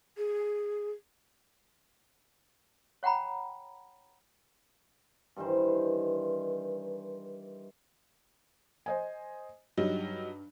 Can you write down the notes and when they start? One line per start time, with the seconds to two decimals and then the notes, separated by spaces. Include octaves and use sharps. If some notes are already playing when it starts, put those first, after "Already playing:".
0.17 G#4
3.03 C#5 F#5 G5 A#5 B5
5.36 G2 D#3 E3 C5
8.86 C5 D#5 G#5
9.77 G2 F#3 G3 D#4